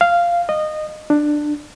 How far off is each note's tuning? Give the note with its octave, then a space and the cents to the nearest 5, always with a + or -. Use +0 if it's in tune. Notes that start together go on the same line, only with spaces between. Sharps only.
F5 -10
D#5 -20
D4 +15